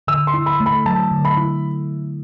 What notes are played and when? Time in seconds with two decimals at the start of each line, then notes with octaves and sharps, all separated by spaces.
0.08 D3 E6
0.27 C6
0.34 E4
0.46 B5
0.60 A3
0.66 B5
0.86 F#3 A5
1.11 D3
1.25 B5
1.37 E4